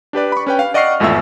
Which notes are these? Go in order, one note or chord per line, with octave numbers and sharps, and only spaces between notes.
D4 G4 B4 D5
B5 C#6
C#4 B4 G5
F5
D5 D#5 F#5 C#6 F6 C7
G#1 E2 A3 F4 E5 E6